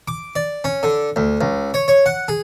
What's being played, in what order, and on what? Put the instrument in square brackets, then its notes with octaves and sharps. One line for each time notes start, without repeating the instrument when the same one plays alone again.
[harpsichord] D6
D5
C#4
D3
D2
C#2
C#5
C#5
F#5
G#4